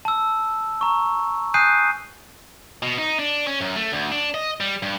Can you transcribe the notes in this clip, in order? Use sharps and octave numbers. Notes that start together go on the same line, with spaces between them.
A5 E6
A#5 C#6
G#5 D#6 F#6 G6 C7 D#7
B2
D#4
D4
C#4
F#2
A3
D2
D4
D#5
G3
G2